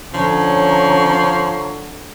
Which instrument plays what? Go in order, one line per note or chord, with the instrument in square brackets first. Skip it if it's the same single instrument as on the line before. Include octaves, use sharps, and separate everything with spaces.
[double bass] D3 [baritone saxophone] F3 [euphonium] C#4 [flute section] C#5 A#5 C#6